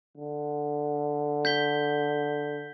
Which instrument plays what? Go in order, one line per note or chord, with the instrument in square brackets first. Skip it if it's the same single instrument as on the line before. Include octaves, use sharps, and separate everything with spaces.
[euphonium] D3
[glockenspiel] G6 B6 G7